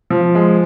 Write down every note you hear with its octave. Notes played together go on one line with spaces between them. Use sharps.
F3
G#3